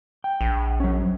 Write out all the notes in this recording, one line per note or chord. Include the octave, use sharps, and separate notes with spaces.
G5
A#1
F#3 C#4